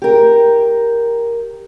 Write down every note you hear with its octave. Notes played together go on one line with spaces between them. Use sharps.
G4 A#4